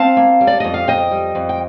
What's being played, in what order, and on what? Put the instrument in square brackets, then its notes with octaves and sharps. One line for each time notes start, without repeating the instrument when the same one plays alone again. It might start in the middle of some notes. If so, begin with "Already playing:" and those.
Already playing: [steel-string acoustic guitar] C4 F5 A5
A#3
G3
D5
F2 D#5
F5
F2 D#5 G5
G3
F2
G5